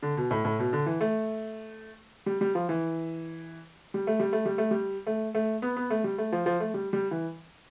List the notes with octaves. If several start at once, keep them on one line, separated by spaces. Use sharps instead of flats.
D3
B2
A2
A2
B2
D3
E3
A3
G3
G3
F3
E3
G3
A3
G3
A3
G3
A3
G3
A3
A3
B3
B3
A3
G3
A3
F3
F3
A3
G3
G3
E3